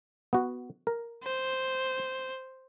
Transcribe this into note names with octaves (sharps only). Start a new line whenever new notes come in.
B3 F#4
A#4
C5